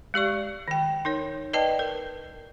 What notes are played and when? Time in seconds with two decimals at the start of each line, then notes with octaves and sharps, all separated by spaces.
0.14 G#3 G4 D5 C#6
0.68 D#3 G5
1.05 D#4 A#4 C#5
1.53 B4 D5 D#5 G5 A5
1.79 A#4